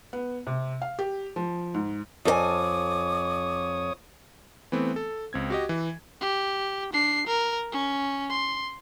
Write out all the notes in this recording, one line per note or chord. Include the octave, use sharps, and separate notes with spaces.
B3
C3
F5
G4
F3
G#2
F2 A4 C#5 G#5 D6 D#6
E3 A3 B3 C4
A4
C#2 C4 G#6
F#4 G4 D#5
E3
G4
D4 C7
A#4
C#4
C6